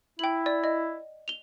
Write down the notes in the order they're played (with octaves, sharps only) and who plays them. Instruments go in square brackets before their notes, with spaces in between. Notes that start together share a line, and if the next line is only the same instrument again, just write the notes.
[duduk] E4 [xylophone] G5 F#7
[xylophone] D5
D#5
F7 G7